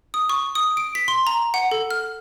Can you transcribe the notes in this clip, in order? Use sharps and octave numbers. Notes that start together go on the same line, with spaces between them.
D#6
C#6
D#6
D7
B6
C6
A#5
F#5
A4
F6